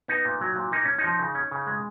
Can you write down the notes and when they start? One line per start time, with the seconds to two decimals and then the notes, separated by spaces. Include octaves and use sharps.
0.08 B3 D#4
0.25 A#2
0.41 F#3
0.56 A#2
0.72 A#3 D#4
0.85 C#4
0.98 D#4
1.04 F3
1.19 C#3
1.35 C#4
1.51 C#3
1.67 G#3